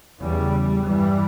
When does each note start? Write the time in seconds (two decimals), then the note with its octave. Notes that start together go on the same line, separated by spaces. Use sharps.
0.20 E2 C#3 E3 G3
0.86 G2 E3 G3